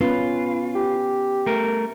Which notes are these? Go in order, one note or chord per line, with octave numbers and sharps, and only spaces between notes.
B3 C#4 F4 B4
G4
A3 A#4